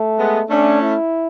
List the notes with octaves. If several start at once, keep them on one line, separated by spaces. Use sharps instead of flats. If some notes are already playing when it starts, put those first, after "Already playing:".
Already playing: A3
G#3 B3
A3 C#4 D4
E4